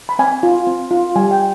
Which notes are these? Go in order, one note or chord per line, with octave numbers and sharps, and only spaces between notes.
B5
C4 G#5
F4
C4
F4
G3 G#5
G5